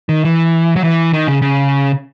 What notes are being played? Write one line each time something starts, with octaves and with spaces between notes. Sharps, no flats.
D#3
E3
F#3
E3
D#3
C#3
C#3